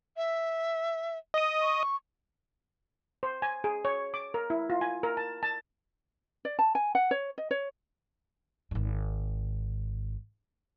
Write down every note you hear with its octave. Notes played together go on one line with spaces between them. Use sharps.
E5
D#5 D#6
C#6
C5
G#5
G#4
C#5
D6
A#4
E4
F4
G#5
A#4
A5
A5
D5
A5
G#5
F#5
C#5
D#5
C#5
G#1 G#2